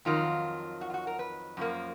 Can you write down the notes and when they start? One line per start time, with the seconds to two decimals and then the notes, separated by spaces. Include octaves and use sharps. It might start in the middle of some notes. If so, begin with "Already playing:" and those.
0.05 F2 D#3 F#3 F4
0.81 F#4
0.90 F4
0.94 F#4
1.07 A#4
1.19 B4
1.57 F#2 F3 A#3